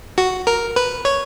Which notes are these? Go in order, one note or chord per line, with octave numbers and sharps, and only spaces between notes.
F#4
A#4
B4
C#5